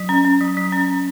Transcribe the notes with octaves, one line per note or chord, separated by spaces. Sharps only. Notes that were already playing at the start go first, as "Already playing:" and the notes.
Already playing: F#3
C#4
C#4
F#3
F#3
C#4
C#4